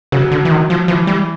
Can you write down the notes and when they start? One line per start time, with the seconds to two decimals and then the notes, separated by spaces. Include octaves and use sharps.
0.12 C#3 F#3
0.31 D3
0.45 E3
0.51 D#3
0.70 F3
0.88 E3 F3
1.07 G3